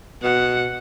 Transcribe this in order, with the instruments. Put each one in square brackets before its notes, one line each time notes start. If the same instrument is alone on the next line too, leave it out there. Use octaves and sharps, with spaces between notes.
[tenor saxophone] B2 [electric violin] F#5